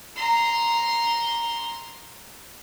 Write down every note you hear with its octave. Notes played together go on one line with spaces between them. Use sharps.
A#5 C6